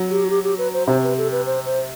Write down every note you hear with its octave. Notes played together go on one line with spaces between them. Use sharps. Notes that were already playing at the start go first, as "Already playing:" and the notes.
Already playing: F#3
G4
F#4
G4
G4
B4
C5
C3 C5
B4
A4
B4
C5
C5